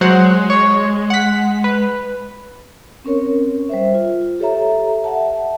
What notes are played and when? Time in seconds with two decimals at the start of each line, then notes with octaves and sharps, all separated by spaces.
0.01 F#3 G#3 C5 F#5
0.50 C#5
1.10 F#5 B6
1.64 B4
3.04 C4 C#4 A#4 C#5
3.69 G3 C5 E5
3.94 F4
4.39 G4 A4 C#5 E5 A#5
5.04 E5 F#5 A5